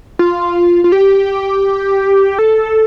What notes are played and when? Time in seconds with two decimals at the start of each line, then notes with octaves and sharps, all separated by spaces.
0.19 F4
0.84 F4
0.92 G4
2.39 A4